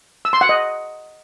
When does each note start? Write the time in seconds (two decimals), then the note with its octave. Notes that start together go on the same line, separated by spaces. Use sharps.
0.25 E6
0.33 C6
0.41 F#5
0.49 D#5